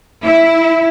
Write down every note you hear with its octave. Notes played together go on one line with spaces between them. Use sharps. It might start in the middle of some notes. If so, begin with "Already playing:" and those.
E4